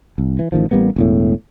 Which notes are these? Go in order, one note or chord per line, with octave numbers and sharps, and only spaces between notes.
C2
E3
A1 D#3 F3
A1 G3 A#3 B3
E1 E2 A2